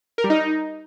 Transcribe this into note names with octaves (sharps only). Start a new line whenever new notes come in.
A#4
G3
D#4